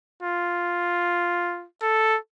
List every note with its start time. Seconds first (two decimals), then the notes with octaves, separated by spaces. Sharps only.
0.22 F4
1.82 A4